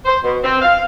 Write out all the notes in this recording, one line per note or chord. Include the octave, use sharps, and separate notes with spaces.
C5
B2
C4
F5